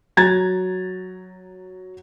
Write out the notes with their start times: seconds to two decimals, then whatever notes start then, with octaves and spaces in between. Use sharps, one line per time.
0.17 F#3 A#5 G#6 A6